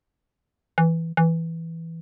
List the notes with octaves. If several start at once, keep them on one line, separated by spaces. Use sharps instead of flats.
E3
E3